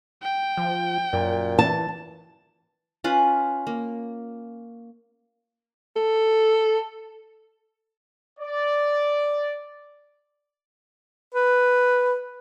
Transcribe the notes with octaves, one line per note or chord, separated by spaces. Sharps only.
G5
F3
F#2 A#2
E3 A5
C#4 F4 B4
A#3
A4
D5
B4